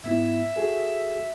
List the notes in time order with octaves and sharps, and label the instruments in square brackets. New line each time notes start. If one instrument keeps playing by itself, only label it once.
[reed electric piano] G#2 B3 E4 [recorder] E5
[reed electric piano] F#4 G#4 A4